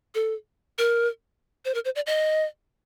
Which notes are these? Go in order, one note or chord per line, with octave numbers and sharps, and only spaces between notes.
A4
A#4
C5
A#4
C5
D5
D#5